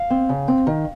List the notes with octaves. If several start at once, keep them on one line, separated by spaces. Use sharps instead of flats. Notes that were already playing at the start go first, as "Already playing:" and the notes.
Already playing: F5
C4
C#3
C4
D#3